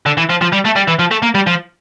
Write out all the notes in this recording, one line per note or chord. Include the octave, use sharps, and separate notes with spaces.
D3
E3
F3
F3
G3
A3
G3
E3
F3
A3
A#3
G3
F3